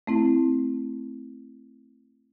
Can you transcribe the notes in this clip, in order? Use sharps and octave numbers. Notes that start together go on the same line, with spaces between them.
A3 C4 E4